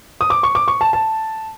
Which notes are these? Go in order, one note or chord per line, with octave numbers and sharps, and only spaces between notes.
D#6
D6
C#6
D6
C#6
A5
A5